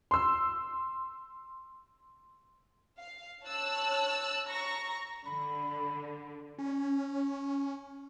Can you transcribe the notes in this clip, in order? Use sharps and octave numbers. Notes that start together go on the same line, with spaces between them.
C6 E6
F5
C#5 A5 E6 F#6
A#5 C#6 A#6
D3 B5
C#4